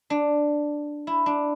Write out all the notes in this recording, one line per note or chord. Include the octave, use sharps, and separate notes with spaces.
D4
E4
D4